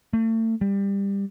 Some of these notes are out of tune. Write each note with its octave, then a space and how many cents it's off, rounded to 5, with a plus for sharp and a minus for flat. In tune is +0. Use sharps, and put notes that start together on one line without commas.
A3 +35
G3 +20